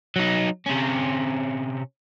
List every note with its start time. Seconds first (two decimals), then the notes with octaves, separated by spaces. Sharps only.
0.16 F#3 D#4
0.66 C3 C#4